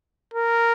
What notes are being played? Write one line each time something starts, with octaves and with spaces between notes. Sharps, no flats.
A#4